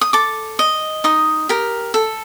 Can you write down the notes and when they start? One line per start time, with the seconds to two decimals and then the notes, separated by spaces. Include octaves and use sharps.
0.01 D#6
0.13 A4 D6
0.59 D#5
1.04 D#4 D#6
1.49 G4 A#4
1.94 A4